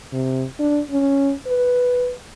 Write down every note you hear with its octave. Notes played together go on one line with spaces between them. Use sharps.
C3
D4
C#4
B4